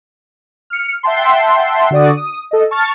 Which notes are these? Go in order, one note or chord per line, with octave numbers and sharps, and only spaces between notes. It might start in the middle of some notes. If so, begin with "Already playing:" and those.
F6 C#7
E5 F#5 G5 A5 C6
D3 F#4 D5 D#6
D#6
A4 D#5
A5 C#6 F6 A6